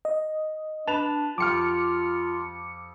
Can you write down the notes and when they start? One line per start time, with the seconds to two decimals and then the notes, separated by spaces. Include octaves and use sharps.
0.05 D#5
0.88 D4 B4 A5 F7
1.38 F2 F4 G4 D6 F6 C#7